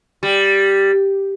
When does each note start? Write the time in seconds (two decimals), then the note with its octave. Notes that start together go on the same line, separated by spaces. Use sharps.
0.23 G3